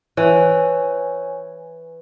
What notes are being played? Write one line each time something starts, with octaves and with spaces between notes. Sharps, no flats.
E3 C#5 G#5